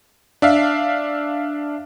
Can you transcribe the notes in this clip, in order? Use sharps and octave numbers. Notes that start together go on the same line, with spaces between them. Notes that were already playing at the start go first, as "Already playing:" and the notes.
D4 E5 F5